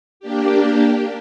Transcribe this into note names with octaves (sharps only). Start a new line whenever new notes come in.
A#3 D4 G4